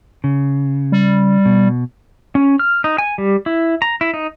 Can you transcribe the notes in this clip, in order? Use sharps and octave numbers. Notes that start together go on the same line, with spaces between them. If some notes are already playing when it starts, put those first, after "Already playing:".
C#3
G3
B2
C#4
F6
D#4
G#5
G3
E4
A#5
E4
D#4